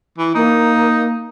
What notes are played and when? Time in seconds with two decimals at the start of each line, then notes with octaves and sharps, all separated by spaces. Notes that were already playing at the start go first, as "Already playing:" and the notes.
0.18 E3
0.35 A#3 D#4